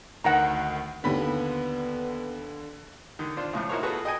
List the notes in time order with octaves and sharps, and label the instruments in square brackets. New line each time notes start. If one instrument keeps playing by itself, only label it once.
[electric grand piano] D2 D#3 [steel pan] F#5 A#5
[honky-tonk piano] D#2 B5 B6 [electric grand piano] D3 [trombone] B3
[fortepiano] D3 D#3
D4 F4 C5
F2 A2 C#3
D#4 E4 F#4 A#4 C5 C#5
B2 F4 F#4 G#4 A4 B4
D#5 G5 G#5